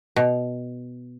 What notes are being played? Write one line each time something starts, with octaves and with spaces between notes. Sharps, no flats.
B2